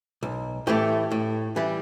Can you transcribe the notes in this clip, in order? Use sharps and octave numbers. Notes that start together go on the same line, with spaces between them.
B1
A2 E3 A3 G4
A2
E3 G3